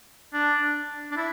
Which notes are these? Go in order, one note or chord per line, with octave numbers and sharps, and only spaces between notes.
D4
D4
E4